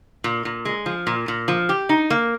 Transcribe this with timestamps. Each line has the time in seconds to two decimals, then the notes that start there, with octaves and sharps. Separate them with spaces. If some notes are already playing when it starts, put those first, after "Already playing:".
0.24 A#2
0.45 A#2
0.65 G#3
0.86 F3
1.07 A#2
1.28 A#2
1.48 F3
1.69 G4
1.89 D#4
2.10 A#3